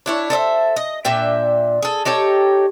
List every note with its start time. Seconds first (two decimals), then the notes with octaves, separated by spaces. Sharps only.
0.06 D4 E4 C#5
0.30 A4 C5 D#5 E5
0.76 D#5
1.05 A#2 D4 E5 G5
1.82 G#4 A4
2.05 D#4 G4 A4 C#5